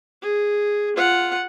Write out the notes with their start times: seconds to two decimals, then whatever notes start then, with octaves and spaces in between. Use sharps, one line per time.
0.22 G#4
0.96 F4 F#5